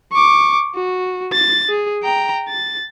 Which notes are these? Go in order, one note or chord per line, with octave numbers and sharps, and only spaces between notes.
C#6 D6
F#4
A6
G#4
G5 A#5
A6